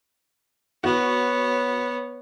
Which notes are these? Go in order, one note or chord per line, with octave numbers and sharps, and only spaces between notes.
B3 F#4 C#5